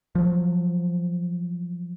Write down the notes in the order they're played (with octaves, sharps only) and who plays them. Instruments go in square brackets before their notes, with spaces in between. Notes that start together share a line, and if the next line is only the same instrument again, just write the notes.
[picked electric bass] F3 F#3